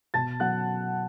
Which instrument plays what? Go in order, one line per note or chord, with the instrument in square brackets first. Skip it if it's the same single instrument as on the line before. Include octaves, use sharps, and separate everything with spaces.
[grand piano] B2 A5 A6
F#3 F#5 F#6